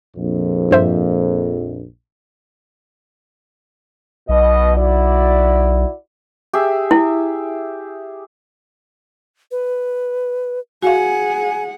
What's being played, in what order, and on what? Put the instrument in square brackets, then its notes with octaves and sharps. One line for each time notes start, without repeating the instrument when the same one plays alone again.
[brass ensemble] A#1 F2
[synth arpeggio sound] G2 C5 E5
[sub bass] B1 [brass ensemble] B2 D#5
[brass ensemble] E4 F#4 D5
[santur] G4 G#4 E5
[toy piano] E4
[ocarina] B4
[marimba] F#4 F5 [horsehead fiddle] G#4 F#5 [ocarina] G#5